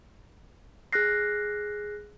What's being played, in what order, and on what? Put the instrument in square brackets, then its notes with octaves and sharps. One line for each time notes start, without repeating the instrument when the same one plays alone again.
[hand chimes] G#4 F6 F#6 A#6 C7